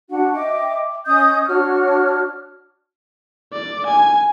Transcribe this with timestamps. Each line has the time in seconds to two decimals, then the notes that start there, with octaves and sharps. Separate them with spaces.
0.10 D4 F#4 F#5
0.33 D#5 E5 G5 D6
1.06 C#4 D#5 D#6 G6
1.48 D4 F#4 C#5 F6
3.53 D5
3.87 G#5